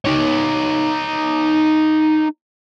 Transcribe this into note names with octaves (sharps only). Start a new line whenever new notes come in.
D#4 C#5